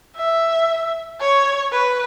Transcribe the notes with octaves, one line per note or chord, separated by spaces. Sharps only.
E5
C#5
B4